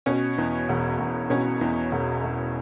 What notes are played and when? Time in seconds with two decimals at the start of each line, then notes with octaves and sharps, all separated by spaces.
0.06 B2 C#4 C#5
0.38 E2
0.69 E1
0.99 E1
1.30 B2 C#4 C#5
1.61 E2
1.92 E1
2.24 E1